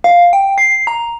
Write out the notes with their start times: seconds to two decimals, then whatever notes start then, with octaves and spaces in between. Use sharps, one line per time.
0.04 F5
0.33 G5
0.58 C7
0.87 A#5